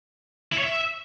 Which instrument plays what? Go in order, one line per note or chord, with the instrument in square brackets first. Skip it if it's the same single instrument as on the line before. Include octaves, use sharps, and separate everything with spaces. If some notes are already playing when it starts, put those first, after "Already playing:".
[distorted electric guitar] E4
C#5
E5